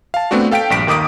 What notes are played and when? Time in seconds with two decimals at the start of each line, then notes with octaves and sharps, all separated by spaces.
0.14 F5 A5
0.31 A3 B3 C4 D4 F#4
0.51 A4 F5 G5 B6 D7
0.70 A#1 G2 B6 D7
0.87 D#2 D#3 D6 D#6 D7